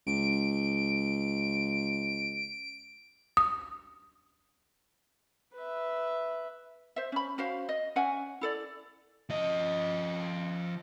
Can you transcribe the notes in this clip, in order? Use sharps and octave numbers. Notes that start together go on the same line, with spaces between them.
C#2 D7
D#6
B4 E5
C5 E5
C#4 B5
C#4 F#4 C5 F5
D#5
C#4 E5 F#5 G#5
E4 A4 D5
F3 D#5